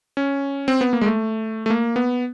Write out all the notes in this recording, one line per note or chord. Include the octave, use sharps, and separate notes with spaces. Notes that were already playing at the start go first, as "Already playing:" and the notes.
C#4
C4
B3
A#3
G#3
A3
A3
A#3
B3